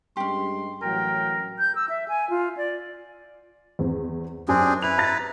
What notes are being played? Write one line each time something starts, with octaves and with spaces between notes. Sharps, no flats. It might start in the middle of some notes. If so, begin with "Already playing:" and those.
G2 G3 G#3 C#4 G4 C6
A1 F#3 A#4 G5
G6
E6
E5
G#5
F4
D5
E2 C4
F#2 C4 D4 G#4 G#5
E4 B4 F7
A#5 A6 A#6